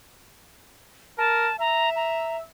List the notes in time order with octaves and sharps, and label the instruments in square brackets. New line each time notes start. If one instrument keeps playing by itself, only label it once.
[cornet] A#4 [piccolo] A5
[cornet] E5 [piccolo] A#5
[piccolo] A#5